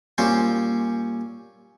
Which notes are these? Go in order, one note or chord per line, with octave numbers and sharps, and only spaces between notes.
A#2 G3 C#4 C5